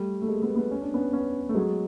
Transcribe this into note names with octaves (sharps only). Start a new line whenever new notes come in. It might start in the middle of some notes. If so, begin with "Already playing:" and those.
Already playing: G3 A3
A3
G#3 A#3
A3 B3
A3 B3
C#4
D4
B3 C#4
B3 C#4
A3
F#3 G#3